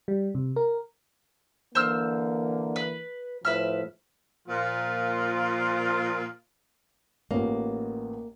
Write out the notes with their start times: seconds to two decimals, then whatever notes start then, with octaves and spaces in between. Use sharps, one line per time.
0.08 G3
0.35 C3
0.56 A#4
1.75 D3 E3 A#3 C5 E6 F6
2.76 B4
3.45 A2 F3 B4 E5 F6
4.48 A#2 F3 F4
7.31 A1 A#3 B3 F4